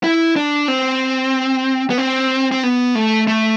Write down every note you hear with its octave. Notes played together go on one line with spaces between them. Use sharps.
E4
D4
C4
B3
C4
C4
B3
A3
A3